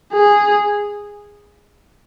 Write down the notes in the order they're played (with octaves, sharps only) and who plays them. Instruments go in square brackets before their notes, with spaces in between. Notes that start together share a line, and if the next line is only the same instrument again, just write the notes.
[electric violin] G#4